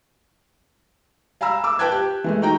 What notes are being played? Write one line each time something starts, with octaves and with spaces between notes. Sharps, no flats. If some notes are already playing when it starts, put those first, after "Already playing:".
F5 G#5 A#5 B5 E6
D6 E6
B4 G5 A5 F#6 G#6
G4
E3 G#3 A3
D#4 F#4 G5 A#5